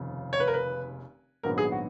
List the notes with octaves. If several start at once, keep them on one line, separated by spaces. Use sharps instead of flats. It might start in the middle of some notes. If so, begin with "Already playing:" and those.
Already playing: F1 D#2 C#3 F3
C#5
B4
A#4
B4
A#1 G#2 D#3 F#3 B3 A#4
G#4
F#4